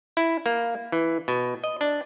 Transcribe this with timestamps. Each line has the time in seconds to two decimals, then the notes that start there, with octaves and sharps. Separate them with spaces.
0.17 E4
0.46 A#3
0.92 E3
1.28 B2
1.64 D#5
1.81 D4